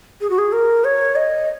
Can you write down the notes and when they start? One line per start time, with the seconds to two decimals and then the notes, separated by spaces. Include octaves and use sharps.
0.21 G#4
0.30 F#4
0.38 G#4
0.52 A#4
0.84 C#5
1.15 D#5